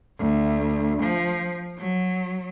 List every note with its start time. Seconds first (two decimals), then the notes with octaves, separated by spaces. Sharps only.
0.19 D2
1.03 F3
1.79 F#3